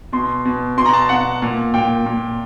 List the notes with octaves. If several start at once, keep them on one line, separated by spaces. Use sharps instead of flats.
B2 C6
B2
B2 C6
A#5
A5
B2 F#5
A#2
A#2 G5
A#2